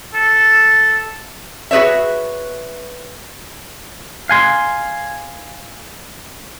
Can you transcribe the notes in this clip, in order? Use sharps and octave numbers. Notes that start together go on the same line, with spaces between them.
A4
F#4 G#4 B4 C#5 E5
F5 G#5 C6